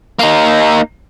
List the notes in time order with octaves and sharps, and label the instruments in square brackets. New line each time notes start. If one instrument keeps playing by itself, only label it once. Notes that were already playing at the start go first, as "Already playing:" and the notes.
[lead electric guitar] A#3 D#4